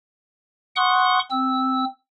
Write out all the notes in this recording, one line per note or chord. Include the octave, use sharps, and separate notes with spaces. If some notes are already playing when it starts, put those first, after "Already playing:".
F#5 C6 C#6 D#6 F#6
C4 E6